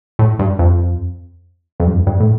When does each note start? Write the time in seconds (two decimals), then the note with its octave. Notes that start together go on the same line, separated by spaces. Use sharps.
0.19 A2
0.39 G2
0.59 F2
1.80 F2
1.87 G2
1.93 F2
2.07 G2
2.20 A2